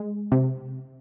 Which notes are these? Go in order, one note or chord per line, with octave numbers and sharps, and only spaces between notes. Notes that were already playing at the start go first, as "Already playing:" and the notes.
Already playing: G#3
C3